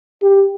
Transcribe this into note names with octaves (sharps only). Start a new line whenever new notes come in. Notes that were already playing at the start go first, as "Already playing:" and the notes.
G4